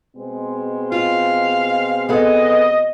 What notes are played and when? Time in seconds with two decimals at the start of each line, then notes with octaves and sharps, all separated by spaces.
0.16 B2 G#3 C4
0.92 F4 F5
2.09 B3 G#4 A4 D#5